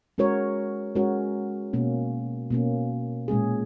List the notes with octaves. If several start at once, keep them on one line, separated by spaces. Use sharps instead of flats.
G#3 C#4 F#4 A#4 C#5
G#3 C#4 F#4 A#4 C#5
B2 A#3 C#4
B2 A#3 C#4
A#2 G#3 C#4 G#4